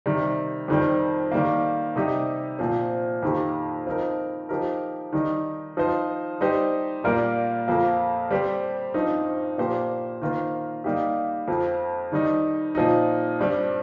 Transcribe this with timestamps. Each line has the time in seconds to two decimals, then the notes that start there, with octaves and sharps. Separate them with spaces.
0.06 C3 D#3 G3
0.68 F2 D#3 G3 C4
1.32 D#3 G3 A#3
1.96 C3 G3 D#4 G4
2.59 A#2 F3 C4
3.23 F2 D#3 A#3 G4
3.87 F3 C4 D#4 A#4
4.49 F3 D#4 G4 A#4
5.13 D#3 G3 D#4
5.77 F3 D#4 C5
6.41 G3 D#4 G4 C5
7.04 A#2 G3 A#3 F4 A#4
7.68 F2 F3 A#3
8.30 G3 C4 G4 C5
8.94 G2 F3 C4 D#4
9.58 A#2 F3 A#3 G4 C5
10.22 D#3 A#3 F4 C5
10.84 G3 A#3 D#4 G4
11.48 F2 F3 C4
12.12 D#3 G3 D#4
12.75 A#2 F3 D#4
13.39 G2 G3 C4